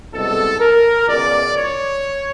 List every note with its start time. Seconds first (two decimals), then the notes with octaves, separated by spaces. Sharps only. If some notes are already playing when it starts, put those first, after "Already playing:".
0.12 C2 B2 G#3 A4
0.60 A#4
1.08 C#2 B2 G#3 D5
1.56 C#5